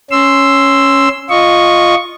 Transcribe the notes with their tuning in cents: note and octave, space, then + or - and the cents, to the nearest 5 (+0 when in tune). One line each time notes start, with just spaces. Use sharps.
C#4 +0 C6 +0 E6 +5
F4 +0 D#5 -10 C#6 +0